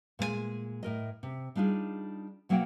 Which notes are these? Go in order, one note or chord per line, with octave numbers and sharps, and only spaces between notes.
A#2 G#3 A#4 G#5
A2 A#4 D#5
C3
G3 D4 D#4 F4 G#4
B2 F#3 A#3 F#5 G5